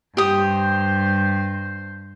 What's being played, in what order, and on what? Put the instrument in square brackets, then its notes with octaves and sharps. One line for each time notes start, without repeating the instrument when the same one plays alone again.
[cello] G2 C5 [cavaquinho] G4 D#6